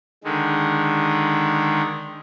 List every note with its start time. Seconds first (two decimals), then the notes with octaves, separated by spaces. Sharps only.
0.24 D3 D#3 G#3